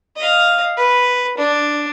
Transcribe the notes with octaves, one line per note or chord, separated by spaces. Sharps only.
D#5 F5
B4
D4